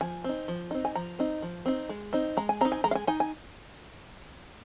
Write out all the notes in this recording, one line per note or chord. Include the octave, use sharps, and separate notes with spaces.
F3 G#5
C4 D#4
F3
C4 D#4
G#5
F3 A#5
C4 D#4
F3
C4 D#4
G#3
C4 D#4
G#3 A#5
G#5
C4 D#4 A#5
G#5
G#3 A#5
F5
G#5
D#4 G#5
G#5